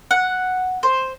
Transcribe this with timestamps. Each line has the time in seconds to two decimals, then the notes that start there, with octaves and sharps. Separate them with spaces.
0.11 F#5
0.83 C5